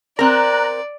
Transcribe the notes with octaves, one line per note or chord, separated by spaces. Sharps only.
C4 A#4 D5 A#5 F#6